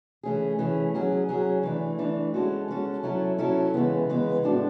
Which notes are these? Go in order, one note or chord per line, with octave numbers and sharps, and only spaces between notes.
E3 A3 C#4 G#4
E3 A3 C#4 G#4
F#3 C#4 G#4
F#3 C#4 G#4
E3 A3 D4
E3 A3 D4
G#3 C#4 F#4 A4
G#3 C#4 F#4 A4
F#3 C#4 E4 A4
F#3 C#4 E4 A4
C#3 E3 G#3 B3
C#3 E3 G#3 B3
A2 G#3 D4 F#4 A4